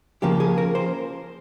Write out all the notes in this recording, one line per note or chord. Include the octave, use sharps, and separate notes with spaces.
C#3 F3 A#3 G4
G#4
A#4
C5